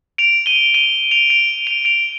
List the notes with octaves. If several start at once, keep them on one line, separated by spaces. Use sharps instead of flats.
D7 F7
D#7 G7
D#7 G7
D7 F7
D7 F7
D7 F7
D7 F7